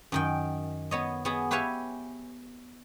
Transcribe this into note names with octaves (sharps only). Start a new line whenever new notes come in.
F#2 D#3 G5
B3 C#5 D#5
B3 F#4 G#4
G4 B4 C#5 E5 F5 G#5